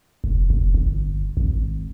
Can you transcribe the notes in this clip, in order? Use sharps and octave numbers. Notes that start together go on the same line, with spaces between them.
F1
F1
G1
G#1